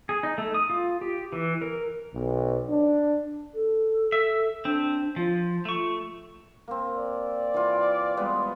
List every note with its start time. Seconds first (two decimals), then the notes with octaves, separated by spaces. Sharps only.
0.09 G#4
0.23 D#4
0.38 A3
0.54 D#6
0.70 F4
1.01 G4
1.33 E3
1.62 A#4
2.14 B1
2.69 D4
3.55 A4
4.12 E5
4.65 C4 D4
5.16 F3 F4
5.65 A3 C#6
6.68 A#3 C4
6.98 D5
7.54 E3 F4
8.17 G3 G#3 B3